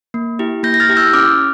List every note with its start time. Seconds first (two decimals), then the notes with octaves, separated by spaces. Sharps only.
0.14 A#3
0.39 E4 G4
0.63 A#3 G6 A#6
0.74 A#6
0.80 F6 A6
0.89 E4 G4
0.97 E6 G6
1.13 C#4 D6 F6